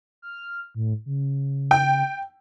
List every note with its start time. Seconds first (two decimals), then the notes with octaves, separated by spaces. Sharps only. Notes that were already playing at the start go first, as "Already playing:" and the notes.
0.22 F6
0.75 A2
1.06 C#3
1.71 G5